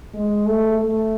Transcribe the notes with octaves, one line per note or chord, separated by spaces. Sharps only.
G#3
A3
A3